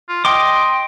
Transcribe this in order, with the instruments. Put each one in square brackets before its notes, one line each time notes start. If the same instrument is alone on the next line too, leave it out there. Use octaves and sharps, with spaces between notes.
[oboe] F4
[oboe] D#5 [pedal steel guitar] G5 C6 D6